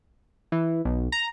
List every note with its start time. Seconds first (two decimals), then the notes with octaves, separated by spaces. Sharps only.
0.52 E3
0.85 B1
1.12 A#5